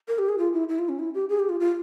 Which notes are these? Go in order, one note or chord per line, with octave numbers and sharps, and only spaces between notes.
A#4
G4
G#4
F4
E4
E4
F4
C#4
E4
G4
G#4
G4
F4
F4